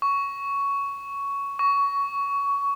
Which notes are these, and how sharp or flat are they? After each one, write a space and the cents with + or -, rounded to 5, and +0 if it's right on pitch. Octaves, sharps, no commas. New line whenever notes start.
C#6 +10
C#6 +20